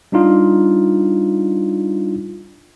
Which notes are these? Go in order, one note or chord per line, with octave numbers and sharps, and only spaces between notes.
G3 D4 D#4 F4